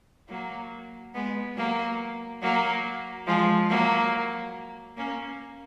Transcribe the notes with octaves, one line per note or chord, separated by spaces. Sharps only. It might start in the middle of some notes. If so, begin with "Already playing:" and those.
F#3 A#3
G#3 B3
F#3 A#3
F#3 A#3
F3 G#3
F#3 A#3
A#3 C#4